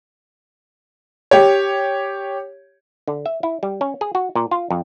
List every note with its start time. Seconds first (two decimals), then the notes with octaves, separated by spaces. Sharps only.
1.31 G4 C#5
3.08 D3
3.26 E5
3.43 E4
3.63 G3
3.81 C#4
4.01 G#4
4.15 F#4
4.35 A#2
4.51 F4
4.70 F2